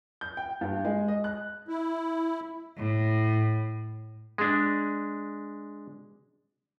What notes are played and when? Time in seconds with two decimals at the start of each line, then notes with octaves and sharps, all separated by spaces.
0.21 G6
0.37 G5
0.61 G2
0.85 G#3
1.08 D#5
1.24 F#6
1.68 E4
2.77 A2
4.38 G#3 D4